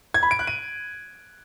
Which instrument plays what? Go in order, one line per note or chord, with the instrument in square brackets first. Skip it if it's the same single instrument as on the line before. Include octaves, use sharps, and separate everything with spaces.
[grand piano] G#6
B5
D7
F#6
D#7